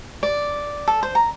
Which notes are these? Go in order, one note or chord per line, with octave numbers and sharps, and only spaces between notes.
D5
A4
C5
A#5